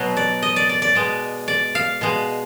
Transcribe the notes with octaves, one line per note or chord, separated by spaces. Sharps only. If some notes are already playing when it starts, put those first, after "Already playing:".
Already playing: B2 F#3
D5
D#5
D5
D5
D5
B2 G#3
D5
F5
B2 G#3